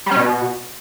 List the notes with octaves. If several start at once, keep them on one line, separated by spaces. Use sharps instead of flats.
G3
C#4
B2